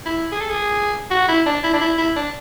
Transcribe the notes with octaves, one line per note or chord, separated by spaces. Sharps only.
E4
G#4
A4
G#4
F#4
E4
D4
E4
D4
E4
E4
D4